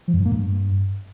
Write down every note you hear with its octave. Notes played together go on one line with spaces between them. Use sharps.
F3
F#2
G2
A#3
G2